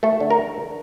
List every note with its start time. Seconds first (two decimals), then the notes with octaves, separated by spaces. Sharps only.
0.03 A3 A4
0.20 D3
0.30 A#4